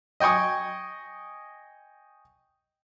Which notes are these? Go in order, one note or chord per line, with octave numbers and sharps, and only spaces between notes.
D#5 G5 G#5 C#6 D#6